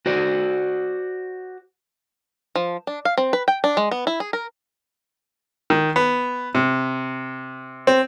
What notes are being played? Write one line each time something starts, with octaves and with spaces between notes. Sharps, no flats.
F#4 C5 D5
F3
D4
F5
C4
B4
G5
D4
G#3
B3
E4
G#4
A#4
D#3
B3
C3
C4